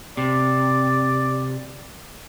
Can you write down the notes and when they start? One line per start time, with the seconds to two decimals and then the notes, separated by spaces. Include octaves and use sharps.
0.17 C3 D5